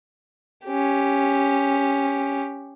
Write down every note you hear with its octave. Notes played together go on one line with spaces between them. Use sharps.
C#4 G4